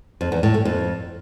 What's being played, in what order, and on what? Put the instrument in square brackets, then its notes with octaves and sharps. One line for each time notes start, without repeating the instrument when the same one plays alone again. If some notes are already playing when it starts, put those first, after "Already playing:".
[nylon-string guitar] F2
E2
A2
A3
F2